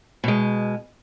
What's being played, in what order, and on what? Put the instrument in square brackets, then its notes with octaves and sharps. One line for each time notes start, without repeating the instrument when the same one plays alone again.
[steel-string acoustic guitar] B2 G#3